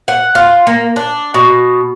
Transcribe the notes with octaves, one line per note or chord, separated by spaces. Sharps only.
F#5
F4
A#3
D4
B2